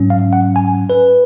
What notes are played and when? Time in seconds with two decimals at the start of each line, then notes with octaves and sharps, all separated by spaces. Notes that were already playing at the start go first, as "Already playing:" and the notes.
Already playing: G#2 F#3 C#4
0.10 F5
0.33 F#5
0.56 G#5
0.90 B4